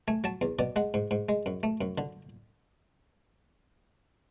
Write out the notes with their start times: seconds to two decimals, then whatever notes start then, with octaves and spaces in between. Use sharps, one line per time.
0.08 A3 G#5
0.24 F#3 A5
0.41 E2
0.59 B2 D5
0.76 G#3 F#5
0.94 G#2
1.11 G#2
1.29 G#3
1.46 F#2
1.63 A3
1.81 F#2
1.98 D3